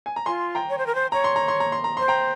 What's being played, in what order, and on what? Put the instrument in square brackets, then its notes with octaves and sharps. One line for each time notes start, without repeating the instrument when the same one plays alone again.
[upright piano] G#5
A#5
[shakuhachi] F4 [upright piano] G#5 C6
[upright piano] G5 A#5
[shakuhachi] C#5
C5
A#4
C5
[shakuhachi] C#5 [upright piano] A#5
[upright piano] C6
A#5
C6
A#5
C6
A#5
[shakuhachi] C5 [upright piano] C6
[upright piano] G5 A#5